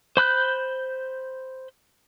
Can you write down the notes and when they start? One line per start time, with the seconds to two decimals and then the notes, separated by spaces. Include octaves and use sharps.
0.17 C5 B5 F#6 G6